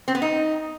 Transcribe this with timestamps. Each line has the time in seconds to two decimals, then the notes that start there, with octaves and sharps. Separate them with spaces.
0.08 C4
0.15 B3
0.22 D#4